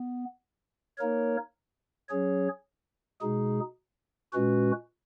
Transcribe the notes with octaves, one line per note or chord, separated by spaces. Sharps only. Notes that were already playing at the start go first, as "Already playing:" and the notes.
Already playing: B3
A#3 D#4 A#4 C#5
F#3 C#4 G#4 C#5
B2 G#3 D#4 G#4
A#2 G#3 C#4 F#4 B4